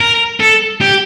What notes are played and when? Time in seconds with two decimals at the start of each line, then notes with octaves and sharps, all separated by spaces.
0.01 A#4
0.40 A4
0.81 G4